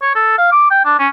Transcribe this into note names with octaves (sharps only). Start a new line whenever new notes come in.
C#5
A4
F5
D6
G5
D4
C#4